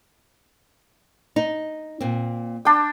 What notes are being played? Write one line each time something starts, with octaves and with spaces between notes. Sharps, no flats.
D#4
A#2 C4
D4 G5